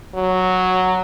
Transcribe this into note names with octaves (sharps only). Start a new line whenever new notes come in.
F#3